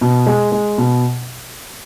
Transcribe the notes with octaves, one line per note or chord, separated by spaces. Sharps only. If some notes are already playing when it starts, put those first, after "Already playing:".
B2
G#3
G#3
B2